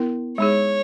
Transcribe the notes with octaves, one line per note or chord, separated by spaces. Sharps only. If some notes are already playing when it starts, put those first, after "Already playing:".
Already playing: B3 E4 A#4
G#3 D#4 G#4 C#5